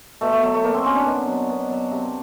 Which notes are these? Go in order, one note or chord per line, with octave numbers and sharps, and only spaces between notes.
B2 A3
A3
F#3 A3
A3
B2 A#3
C4
F#3 C#4
D4
B2
F#3
B2
F#3
C3